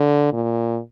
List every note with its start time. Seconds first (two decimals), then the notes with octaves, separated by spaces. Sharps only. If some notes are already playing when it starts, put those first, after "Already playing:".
Already playing: D3
0.33 A#2